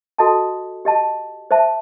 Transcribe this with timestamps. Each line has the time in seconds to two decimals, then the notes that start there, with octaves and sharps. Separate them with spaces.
0.18 F#4 A4 D#5 A5
0.85 G4 D#5 A5
1.51 C5 E5 A5